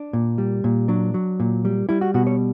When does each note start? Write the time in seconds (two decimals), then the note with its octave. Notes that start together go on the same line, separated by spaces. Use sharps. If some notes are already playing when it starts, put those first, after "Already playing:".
Already playing: D4
0.13 A#2
0.38 G3
0.64 A#2
0.88 F#3 D4
1.14 F#3
1.40 A#2
1.65 G3
1.89 G3 E4
2.01 F#4
2.14 B2 F#4
2.27 C#5